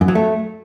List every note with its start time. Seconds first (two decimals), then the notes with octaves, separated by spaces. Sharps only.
0.01 F#2
0.08 F#3
0.15 A3